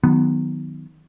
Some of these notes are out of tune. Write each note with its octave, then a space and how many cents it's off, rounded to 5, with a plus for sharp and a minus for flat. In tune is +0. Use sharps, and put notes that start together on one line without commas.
D#3 +0 F#3 -15 B3 +10